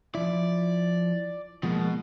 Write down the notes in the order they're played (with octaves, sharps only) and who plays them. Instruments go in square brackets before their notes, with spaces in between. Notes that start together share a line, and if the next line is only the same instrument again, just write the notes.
[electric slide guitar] F3 E4 [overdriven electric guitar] D5
[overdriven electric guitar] B2 [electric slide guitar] F3 G#3 A#3